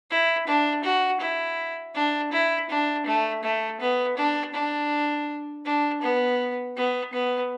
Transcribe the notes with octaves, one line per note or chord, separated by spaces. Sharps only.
E4
D4
F#4
E4
D4
E4
D4
A3
A3
B3
D4
D4
D4
B3
B3
B3